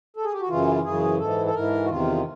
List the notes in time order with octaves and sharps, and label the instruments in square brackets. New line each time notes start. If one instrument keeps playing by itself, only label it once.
[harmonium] A4
G#4
G4
F#4
F#2 C#3 E3 F4
F#2 C#3 E3 G#4
G#2 E3 A4
A4
G#2 E3 A#4
F#4
E2 C3 D#3 F4